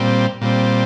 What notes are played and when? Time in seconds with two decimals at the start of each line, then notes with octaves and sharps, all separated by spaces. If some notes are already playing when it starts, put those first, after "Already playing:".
Already playing: A#2 G3 C4
0.41 A#2 G3 C4